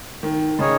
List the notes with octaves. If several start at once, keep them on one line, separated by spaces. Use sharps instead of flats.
D#3
C#3 D#4 G#4 C#5